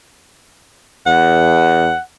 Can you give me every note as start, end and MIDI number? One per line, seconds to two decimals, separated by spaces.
1.07 1.92 40
1.07 2.00 78